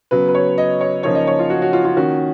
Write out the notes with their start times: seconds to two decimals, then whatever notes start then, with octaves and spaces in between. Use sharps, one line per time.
0.11 C#3 F#3 B3 B4
0.28 B4
0.35 C#5
0.58 D#5
0.81 C#5
1.03 C#3 F3 A#3 D#4 C#5
1.15 D#5
1.27 C#5
1.39 F4
1.50 F#4
1.62 F#4
1.73 F4
1.85 F4
1.96 D#3 A#3 C#4 F#4